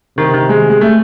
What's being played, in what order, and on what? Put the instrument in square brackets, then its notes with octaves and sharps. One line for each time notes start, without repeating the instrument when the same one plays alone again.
[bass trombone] C3 [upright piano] D#3
[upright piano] D#3
G#3
G#3
A3